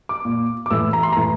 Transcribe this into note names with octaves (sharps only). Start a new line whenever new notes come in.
D6
A#2
D6
A2 E3 E6
A#5
C6
A2 E3 A#5